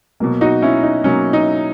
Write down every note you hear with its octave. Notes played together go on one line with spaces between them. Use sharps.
B2 F#3 A#3
D#4 F#4
C#4 E4
D#4
B2 F#3 A#3 C#4
D#4